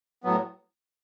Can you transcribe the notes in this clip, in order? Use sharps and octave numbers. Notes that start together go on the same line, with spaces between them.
A2 F#3 B3